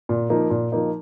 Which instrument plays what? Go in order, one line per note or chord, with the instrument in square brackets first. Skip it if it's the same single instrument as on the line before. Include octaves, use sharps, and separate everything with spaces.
[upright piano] A#2
F3 A#3 D#4
A#2
F3 A#3 D#4